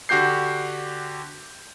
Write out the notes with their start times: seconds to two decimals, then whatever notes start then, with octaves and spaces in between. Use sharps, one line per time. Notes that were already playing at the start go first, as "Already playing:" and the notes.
0.09 D3 F#4 G4 G6 C7